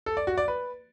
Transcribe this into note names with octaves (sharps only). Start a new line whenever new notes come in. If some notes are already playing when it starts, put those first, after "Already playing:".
A4
D5
F#4
D5
B4